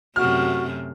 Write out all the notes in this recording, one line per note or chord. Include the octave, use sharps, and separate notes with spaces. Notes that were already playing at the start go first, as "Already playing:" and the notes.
F#2 C3 A3 F#4 F6